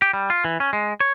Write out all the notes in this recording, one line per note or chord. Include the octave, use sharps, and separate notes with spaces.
G4
G3
F4
E3
C#4
G#3
C#5